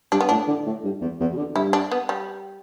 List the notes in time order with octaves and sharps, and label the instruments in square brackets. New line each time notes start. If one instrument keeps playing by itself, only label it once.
[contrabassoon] G2 [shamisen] D4
[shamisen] B3
[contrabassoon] A2 [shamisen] D4
[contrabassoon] D3
A2
G2
E2
E2
B2
D3
[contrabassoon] G2 [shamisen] E4
[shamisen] D4
B3
G3